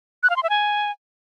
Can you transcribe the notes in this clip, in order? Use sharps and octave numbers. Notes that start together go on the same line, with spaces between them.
F#6
F5
C6
E5
G#5